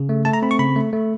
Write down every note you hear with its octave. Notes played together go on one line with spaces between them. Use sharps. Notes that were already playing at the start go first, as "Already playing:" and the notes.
Already playing: C#3
A3
A3 A5
A#5
C4 B5
C#6
C#3 B5
A3
A3